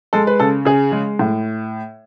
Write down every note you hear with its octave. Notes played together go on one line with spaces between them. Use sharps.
G#3 A4
B4
C#3 A4
C#3 G#4
G#3
A2